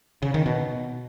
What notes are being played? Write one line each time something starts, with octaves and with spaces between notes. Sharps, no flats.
C#3
D#3
B2